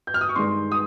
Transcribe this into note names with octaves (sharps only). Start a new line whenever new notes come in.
G6
F6
D#6
C#6
G2 D#3 G#3 C6
D#6